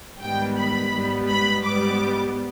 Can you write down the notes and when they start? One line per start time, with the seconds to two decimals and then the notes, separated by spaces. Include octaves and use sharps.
0.20 G#2 D#3 G3 B3 G5
0.57 B5
0.93 G#2 G3 B3
1.29 B5
1.64 G#2 G3 B3 D6